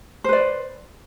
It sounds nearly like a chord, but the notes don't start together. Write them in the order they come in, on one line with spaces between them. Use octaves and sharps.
C5 B4 D5